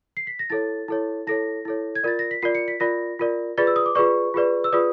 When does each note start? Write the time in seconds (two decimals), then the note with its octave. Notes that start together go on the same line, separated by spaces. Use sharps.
0.17 C7
0.27 B6
0.39 A#6
0.50 E4 A4 C#5 A6
0.88 E4 A4 C#5
1.27 E4 A4 C#5 A#6
1.65 E4 A4 C#5
1.95 G#6
2.03 F4 A#4 D5 A6
2.19 A#6
2.31 B6
2.42 F4 A#4 D5 C7
2.55 C#7
2.68 B6
2.80 F4 A#4 D5 A#6
3.19 F4 A#4 D5
3.58 F4 G#4 B4 D5 A6
3.67 E6
3.76 D#6
3.86 D6
3.95 F4 G#4 B4 D5 C#6
4.34 F4 G#4 B4 D5
4.64 E6
4.73 F4 G#4 B4 D5 D#6